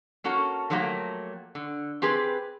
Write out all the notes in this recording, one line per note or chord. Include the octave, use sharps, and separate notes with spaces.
A#3 C#4 F#4 A4
D3 F3 F#3 A3 A#3 G4
D3
C4 G4 G#4 B4